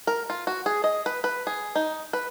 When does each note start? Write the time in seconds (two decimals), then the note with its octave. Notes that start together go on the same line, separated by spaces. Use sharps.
0.07 A#4
0.30 F4
0.47 F#4
0.66 G#4
0.84 D#5
1.06 B4
1.24 B4
1.47 G#4
1.76 D#4
2.13 B4